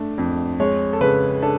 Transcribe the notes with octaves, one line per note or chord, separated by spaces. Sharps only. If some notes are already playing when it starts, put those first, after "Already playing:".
Already playing: A3 D4
F2
G#3 C#5
A4
C#3 B4
D4 A4